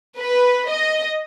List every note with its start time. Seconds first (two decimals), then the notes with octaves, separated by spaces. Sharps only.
0.17 B4
0.69 D#5